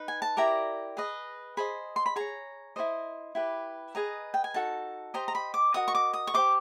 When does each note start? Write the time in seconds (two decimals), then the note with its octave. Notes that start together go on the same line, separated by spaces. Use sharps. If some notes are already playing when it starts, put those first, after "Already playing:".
Already playing: D#4 B4
0.08 G#5
0.22 A5
0.37 E4 G4 A#4 D5 A#5
0.97 G#4 B4 D#5
1.57 G#4 C5 D#5 B5
1.96 C6
2.06 B5
2.16 G#4 C#5 A#5
2.76 E4 A4 C5 D#5
3.35 E4 G4 B4
3.95 G#4 B4 D#5 A#5
4.34 G5
4.44 G#5
4.54 D#4 F#4 A4 A5
5.14 G4 C5 D#5 A#5
5.28 A#5
5.35 B5
5.54 D6
5.74 F#4 A#4 D#5 D#6
5.88 C#6
5.95 D6
6.13 D#6
6.27 C#6
6.34 G4 C5 D#5 D6